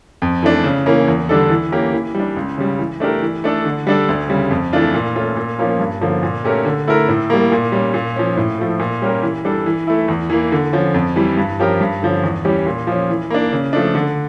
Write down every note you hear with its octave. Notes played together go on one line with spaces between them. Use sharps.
F2
E3 A3 D4
C#3
E3 A#3 C#4
E2
D3 G3 D4 A4
E3
A#3 C#4 G4 A#4
E3
G3
D4
C#2
C#3 G3
E3
A3 D4 G4 A#4
E3
A3 D4 A4
D3
G3 D4 A4
D2
C#3 G3
F2
E3 A3 D4 F4
A#2
A3 C#4 F4
A#2
F3 A#3 C#4 F4
G2
D3 F3 A#3 C#4
A#2
A3 C#4 G4 A#4
D3
A3 E4 A#4
A2
G3 A#3
A#2
G3 C#4
A#2
F3 C#4
A2
F3 A3
A#2
G3 C#4 G4 A#4
E3
G3 D4 A4
E3
A3 E4
E2
E3 A#3
D3
F3 C#4
F2
E3 G3
G2
F3 C#4 G4 A#4
G2
D3 F3 C#4
E2
E3 G3 C#4 G4
A#2
F3 C#4
E3
A#3 D4
C#3
F3 A3 D4
D3